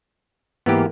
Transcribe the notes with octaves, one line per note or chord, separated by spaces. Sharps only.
G#2 E3 A#3 B3 G4